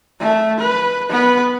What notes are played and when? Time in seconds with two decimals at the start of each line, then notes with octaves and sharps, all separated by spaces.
0.20 A3 E5
0.58 B4
1.09 B3 B4